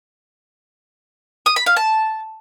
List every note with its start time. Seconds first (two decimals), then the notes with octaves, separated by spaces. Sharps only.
1.46 D#6
1.56 B5
1.66 F5
1.77 A5